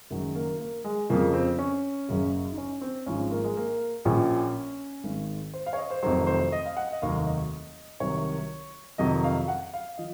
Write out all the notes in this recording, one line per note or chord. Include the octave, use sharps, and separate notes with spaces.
F#1 F#2 D#3 F#3 G#3
A#3
A#3
G#3
F2 C#3 F3 A#3
C4
C#4
F#1 F#2 C#3 F#3
D#4
C#4
C4
G#1 G#2 F3 C#4
A#3
G#3
A#3
A#1 A#2 F3 C#4
G#1 G#2 D#3
C5
F5
C#5
D#5
C5
F1 F2 C3 D#3 F#3 C5
C5
D#5
F5
F#5
D#5
F1 D#2 D#3 F#3 F5
D#5
C2 C3 D#3 F#3 C#5
F2 C3 D#3 F#3 D#5
F5
F#5
F5
F3 D#5